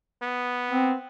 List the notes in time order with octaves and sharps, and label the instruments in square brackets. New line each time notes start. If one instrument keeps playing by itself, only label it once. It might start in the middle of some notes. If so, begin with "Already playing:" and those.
[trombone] B3
[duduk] C4